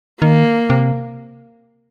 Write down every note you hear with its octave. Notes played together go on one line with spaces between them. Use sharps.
D#3 A#3
C3